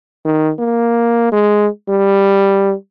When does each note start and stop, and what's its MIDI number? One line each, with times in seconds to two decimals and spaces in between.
0.25 0.52 51
0.59 1.28 58
1.32 1.68 56
1.89 2.73 55